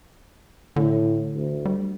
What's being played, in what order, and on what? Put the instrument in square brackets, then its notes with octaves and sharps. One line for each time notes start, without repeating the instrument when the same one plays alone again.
[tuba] A2 [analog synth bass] D3
[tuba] D2
[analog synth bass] G3